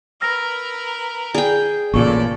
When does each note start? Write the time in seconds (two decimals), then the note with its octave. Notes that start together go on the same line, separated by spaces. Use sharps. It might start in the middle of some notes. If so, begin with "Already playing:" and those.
0.21 A#4 B4 E6 F6 A#6
1.35 G#4 D5 G5
1.94 A1 A#2 C#3 A4 D5 C#6